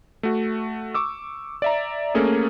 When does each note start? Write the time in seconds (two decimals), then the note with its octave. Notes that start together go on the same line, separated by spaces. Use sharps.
0.23 A3 F#4
0.94 C#6 D6 E6
1.62 D5 E5 A#5
2.14 A3 A#3 C#4 G#4 A4